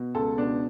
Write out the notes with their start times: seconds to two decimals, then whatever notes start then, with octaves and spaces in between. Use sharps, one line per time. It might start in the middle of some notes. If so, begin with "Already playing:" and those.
Already playing: B2
0.14 C#2 A4
0.37 B2 D4